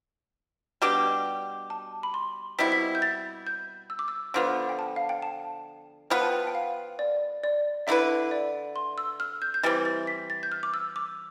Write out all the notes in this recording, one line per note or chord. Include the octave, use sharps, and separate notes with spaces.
B2 G3 D4 G4
A5
B5
C6
B2 G3 C4 E4 B6
B6
G6
A6
G6
E6
D6
E6
D3 F3 B3 C6
G5
A5
F5
G5
A5
F3 B3 F4 B4 G5
A5
G5
G5
F5
D5
D5
D3 A3 E4 B4 E5
D5
C6
E6
F6
G6
G6
E3 G3 C4 A6
A6
B6
A6
G6
F6
D6
E6
D6